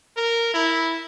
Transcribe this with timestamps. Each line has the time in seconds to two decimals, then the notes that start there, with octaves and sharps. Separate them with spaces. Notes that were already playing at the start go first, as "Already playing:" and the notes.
0.16 A#4
0.54 E4